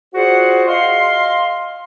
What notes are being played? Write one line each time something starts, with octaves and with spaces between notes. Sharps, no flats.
F4 F#4 G#4 C5 D5 F#5
D#5 F5 C6